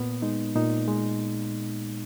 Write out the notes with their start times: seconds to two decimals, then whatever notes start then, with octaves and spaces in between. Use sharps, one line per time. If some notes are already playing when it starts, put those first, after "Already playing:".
Already playing: A#2 B3
0.22 G#3 D#4
0.56 A#2 D#4
0.88 G#3